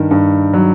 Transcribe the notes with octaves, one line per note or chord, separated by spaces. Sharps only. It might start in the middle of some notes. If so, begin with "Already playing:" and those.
Already playing: G2 D#3
G2
F#3